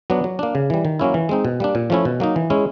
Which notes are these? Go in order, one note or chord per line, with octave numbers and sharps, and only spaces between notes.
F#3 B3 D4
F#3
A#3 D4
C#3
E3 G3
D#3
F#3 A#3 C#4 E4
E3
G#3 C4 D#4
B2
G3 A#3 D4
A#2
F3 A3 C#4 E4
B2
F#3 A#3 D#4
E3
G#3 C#4 E4